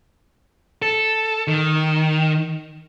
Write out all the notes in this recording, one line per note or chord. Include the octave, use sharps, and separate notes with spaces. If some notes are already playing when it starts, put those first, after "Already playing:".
A4
D#3